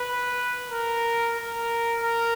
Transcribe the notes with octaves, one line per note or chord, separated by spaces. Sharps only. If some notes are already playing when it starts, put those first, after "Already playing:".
Already playing: B4
A#4
A#4
A#4